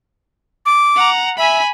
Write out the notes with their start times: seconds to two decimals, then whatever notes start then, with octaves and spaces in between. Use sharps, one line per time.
0.66 D6
0.96 F#5 A#5
1.38 E5 G#5 B5